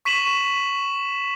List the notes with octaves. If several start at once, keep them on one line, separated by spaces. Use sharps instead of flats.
C#6 B6 D#7 E7 F#7